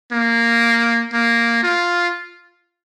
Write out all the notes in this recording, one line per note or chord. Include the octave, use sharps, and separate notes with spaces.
A#3
A#3
F4